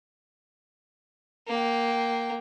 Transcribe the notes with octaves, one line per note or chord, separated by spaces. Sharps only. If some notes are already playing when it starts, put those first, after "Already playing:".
A#3 G5